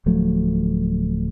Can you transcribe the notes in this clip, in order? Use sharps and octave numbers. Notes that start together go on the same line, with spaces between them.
D1 F3 F#3 A3